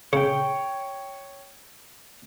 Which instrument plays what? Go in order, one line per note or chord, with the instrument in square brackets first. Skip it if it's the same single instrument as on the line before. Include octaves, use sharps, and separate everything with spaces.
[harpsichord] C#3 [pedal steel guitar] C#5 G5